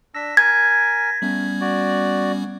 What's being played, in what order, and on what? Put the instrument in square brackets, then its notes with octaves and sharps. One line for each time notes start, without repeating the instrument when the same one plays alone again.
[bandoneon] D4 E6 [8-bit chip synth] A#6 B6
[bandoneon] A#4 G#5 [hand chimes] G#6
[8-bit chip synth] G3 B3 C#4 [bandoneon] A3
[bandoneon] F#4 D5